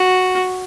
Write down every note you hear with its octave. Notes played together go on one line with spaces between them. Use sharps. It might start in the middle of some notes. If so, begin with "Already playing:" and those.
Already playing: F#4